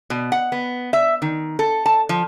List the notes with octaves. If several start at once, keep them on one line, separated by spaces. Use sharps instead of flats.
B2
F#5
B3
E5
D#3
A4
A5
F3